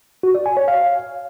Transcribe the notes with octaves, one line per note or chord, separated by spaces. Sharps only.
F#4
D5
G#5
C#5
F5